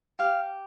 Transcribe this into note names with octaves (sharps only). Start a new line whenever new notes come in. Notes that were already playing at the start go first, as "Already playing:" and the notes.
G4 F5